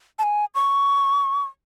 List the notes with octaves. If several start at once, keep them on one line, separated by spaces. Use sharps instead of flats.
A5
G#5
C#6